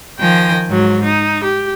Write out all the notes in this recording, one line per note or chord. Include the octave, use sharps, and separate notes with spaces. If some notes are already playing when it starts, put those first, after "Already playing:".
D#3 F3 G5 G#5 A#6
G#2 F#3
D#4
G4